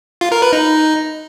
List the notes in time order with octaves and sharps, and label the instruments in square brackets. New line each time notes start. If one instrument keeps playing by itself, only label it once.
[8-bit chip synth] F4
A#4
B4
D#4